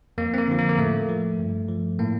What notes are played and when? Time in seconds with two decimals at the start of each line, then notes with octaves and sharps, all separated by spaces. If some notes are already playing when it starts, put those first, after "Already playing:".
0.18 F2 A#3
0.34 C4
0.38 A#3
0.47 D3 F3
0.59 A#3
0.69 A#3
0.78 A2 A3
1.09 F3
1.39 G2
1.69 F3
1.99 A2 A#3